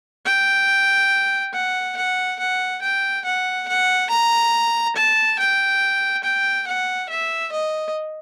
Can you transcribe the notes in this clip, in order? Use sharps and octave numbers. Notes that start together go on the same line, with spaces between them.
G5
F#5
F#5
F#5
G5
F#5
F#5
A#5
A5
G5
G5
F#5
E5
D#5